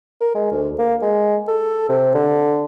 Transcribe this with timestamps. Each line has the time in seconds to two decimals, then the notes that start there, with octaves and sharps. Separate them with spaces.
0.21 A#4
0.34 G#3
0.51 D2
0.79 A#3
1.02 G#3
1.48 A4
1.89 C3
2.15 D3